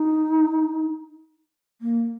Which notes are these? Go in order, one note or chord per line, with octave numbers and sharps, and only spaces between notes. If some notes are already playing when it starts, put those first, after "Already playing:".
Already playing: D#4
A#3